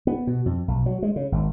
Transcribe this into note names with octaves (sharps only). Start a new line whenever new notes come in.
B3
B2
F2
B1
F#3
G#3
C#3
G#1